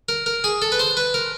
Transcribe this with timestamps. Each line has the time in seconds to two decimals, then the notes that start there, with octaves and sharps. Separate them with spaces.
0.09 A#4
0.26 A#4
0.44 G#4
0.62 A4
0.72 B4
0.79 C5
0.97 B4
1.14 A#4